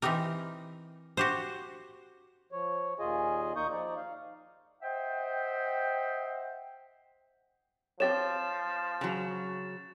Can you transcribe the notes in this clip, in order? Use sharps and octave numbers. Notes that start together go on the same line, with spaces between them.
E3 C4 D#4 G4 A#4
F#4 G4 C5
F3 C#5
D#2 A#2 F4 G#4 D#5 G#5
D#2 A#3 D#4 C#6 D#6 G6
F3 D#4 D5
F5
C5 D#5 E5 F#5 G5
F3 C4 G4 C#5 A6 E7
C#3 F#3